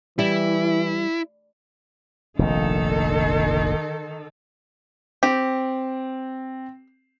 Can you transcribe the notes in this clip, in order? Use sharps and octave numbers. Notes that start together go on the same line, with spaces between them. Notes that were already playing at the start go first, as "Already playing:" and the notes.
E3 G3 E4
F1 A#1 D#3 A4
C4 G4